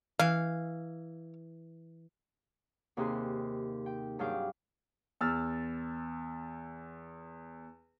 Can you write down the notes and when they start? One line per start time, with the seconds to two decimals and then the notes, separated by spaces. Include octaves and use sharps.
0.19 E3 F5
2.97 D#2 C3 D#4 G#4 C6 F#6
3.86 G5
4.19 G2 F#3 G#4 F5 G5 D6
5.21 E2 E6 F6 A6